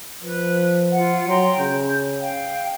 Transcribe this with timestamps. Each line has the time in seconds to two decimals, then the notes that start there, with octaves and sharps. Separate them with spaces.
0.22 F3 B4
0.93 F4 F#5
1.28 F#3 G5 A#5 C6
1.59 C#3 G6
2.20 F5 G5